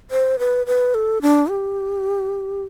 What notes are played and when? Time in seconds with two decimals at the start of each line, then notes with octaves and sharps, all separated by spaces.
0.11 C5
0.39 B4
0.67 B4
0.94 A4
1.22 D4
1.50 G4